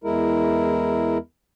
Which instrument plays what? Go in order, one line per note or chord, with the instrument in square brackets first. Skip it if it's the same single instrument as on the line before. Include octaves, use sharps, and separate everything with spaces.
[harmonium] E2 G#3 E4 A#4